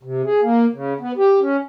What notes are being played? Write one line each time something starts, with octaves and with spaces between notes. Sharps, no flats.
C3
G#4
A#3
C#3
B3
G4
C#4